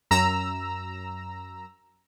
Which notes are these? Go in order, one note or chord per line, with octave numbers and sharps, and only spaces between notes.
F#2 A#5 E6